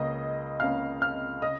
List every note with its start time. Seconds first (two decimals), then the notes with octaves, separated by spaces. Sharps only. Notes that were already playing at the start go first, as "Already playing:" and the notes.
Already playing: C#2 C#3 A#3 D#5
0.60 C#2 C#3 A#3 F5 F6
1.01 F5 F6
1.42 C#3 D#5 D#6